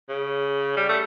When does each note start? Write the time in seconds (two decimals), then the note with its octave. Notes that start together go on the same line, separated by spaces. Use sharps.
0.09 C#3
0.76 G3
0.89 A3